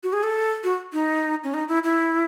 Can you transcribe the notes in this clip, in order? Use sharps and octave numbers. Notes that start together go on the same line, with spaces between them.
F#4
G#4
A4
F#4
D#4
C#4
D#4
E4
E4